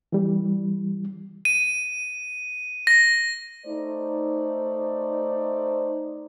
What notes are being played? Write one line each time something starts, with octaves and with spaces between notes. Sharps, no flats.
E3 G3
D#7
A#6
A3 D#4 C5 D5